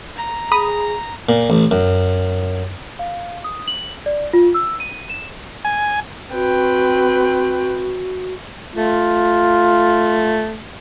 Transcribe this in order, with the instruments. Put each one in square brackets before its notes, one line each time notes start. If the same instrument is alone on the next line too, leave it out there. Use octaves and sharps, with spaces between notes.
[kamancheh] A#5
[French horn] G#4 [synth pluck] B5 D#6
[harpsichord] A#2
A1
F#2
[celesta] F5
D#6
F#7
D5
F4
E6
D#7
E7
[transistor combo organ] G#5
[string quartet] C4 B4 G5 [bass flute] F#4
[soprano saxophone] A3 [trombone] F4